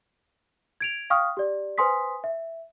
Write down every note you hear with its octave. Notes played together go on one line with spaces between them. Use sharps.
G#6 D7 F7
F5 G5 C#6 D#6 F6
G4 D5
B4 C5 G#5 C6 D#6 B6
E5